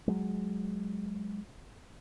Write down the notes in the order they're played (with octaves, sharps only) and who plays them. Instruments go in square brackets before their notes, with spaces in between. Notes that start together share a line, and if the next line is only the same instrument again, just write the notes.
[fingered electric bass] F#3 G#3